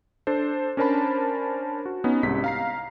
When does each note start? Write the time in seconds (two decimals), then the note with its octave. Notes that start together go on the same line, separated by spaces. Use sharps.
0.27 D4 A4 C5
0.77 C#4 D4 A#4 C5 A5 B5
1.86 F#4
2.04 B3 C#4 D#4
2.23 C2 G#2 C#4 G4 B6
2.44 F5 A#5 C7